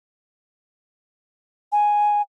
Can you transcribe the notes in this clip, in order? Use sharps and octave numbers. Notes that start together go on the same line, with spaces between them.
G#5